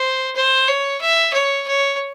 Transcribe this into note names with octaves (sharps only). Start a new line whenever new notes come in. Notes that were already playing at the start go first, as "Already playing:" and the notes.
Already playing: C5
C5
C#5
E5
C#5
C#5